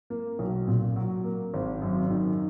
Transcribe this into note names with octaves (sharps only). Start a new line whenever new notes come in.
A#3
B1
A#2
F#3
A#3
G#1
F#2
D#3